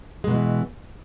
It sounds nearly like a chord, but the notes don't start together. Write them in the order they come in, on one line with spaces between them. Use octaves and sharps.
G#3 B2 F#3 E3